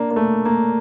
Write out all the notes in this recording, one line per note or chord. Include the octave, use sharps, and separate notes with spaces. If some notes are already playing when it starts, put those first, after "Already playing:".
Already playing: A#3 D4
A#3
A3
A#3